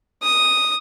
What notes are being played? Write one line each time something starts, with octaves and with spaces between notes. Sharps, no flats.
D#6